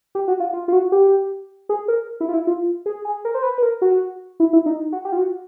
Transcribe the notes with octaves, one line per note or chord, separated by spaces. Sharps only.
G4
F#4
F4
F4
F4
F#4
G4
G#4
A#4
E4
F4
E4
F4
G#4
G#4
A#4
C5
B4
B4
A#4
F#4
E4
E4
D#4
F#4
G4
F4
F#4